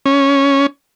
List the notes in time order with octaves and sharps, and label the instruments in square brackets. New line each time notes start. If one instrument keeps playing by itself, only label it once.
[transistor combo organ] C#4